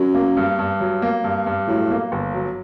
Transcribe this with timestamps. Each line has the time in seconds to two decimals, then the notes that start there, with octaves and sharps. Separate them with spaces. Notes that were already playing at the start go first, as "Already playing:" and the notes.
Already playing: F#2 F#3
0.14 A#3
0.37 G2
0.59 G2
0.80 F#3
1.02 A#3
1.24 G2
1.46 G2
1.68 A2 F#3
1.91 A#3
2.12 G1
2.34 F#3